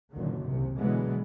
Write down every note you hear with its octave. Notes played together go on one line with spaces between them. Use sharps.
F#1 F#2 A#2 D3 D#3
C2 C3
B2 D3 E3 F#3 G#3 B3